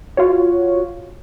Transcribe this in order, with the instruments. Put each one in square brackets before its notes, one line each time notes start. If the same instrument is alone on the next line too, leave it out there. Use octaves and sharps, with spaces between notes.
[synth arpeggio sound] F4 F#4 C#5